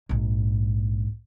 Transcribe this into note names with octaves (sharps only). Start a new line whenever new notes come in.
A#1 G#2